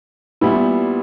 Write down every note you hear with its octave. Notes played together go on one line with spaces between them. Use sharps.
A#2 G3 B3 E4